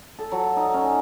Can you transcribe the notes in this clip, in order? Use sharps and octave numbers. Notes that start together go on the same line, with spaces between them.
A4
F#3
D#4
C#4